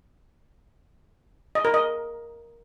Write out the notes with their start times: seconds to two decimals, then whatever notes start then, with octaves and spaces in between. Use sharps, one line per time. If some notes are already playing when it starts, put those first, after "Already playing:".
1.55 D#5
1.65 A#4
1.74 D#5